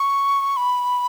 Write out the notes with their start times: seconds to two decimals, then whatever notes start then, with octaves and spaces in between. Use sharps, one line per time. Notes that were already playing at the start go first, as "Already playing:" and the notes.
Already playing: C#6
0.57 B5